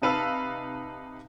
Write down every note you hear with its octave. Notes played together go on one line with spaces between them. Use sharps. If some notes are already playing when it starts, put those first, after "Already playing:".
C3 D#4 B4 F5 A5 E6